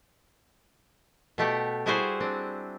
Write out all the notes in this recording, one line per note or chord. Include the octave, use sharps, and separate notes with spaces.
B2 A3 G4 F#5
G3 E4 F#4 G#4 C5
C4 D4